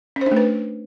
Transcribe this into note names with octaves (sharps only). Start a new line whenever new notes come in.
C#4
C5
D4
A3
B4